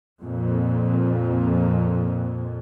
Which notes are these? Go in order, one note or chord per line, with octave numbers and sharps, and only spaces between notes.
F2 A#2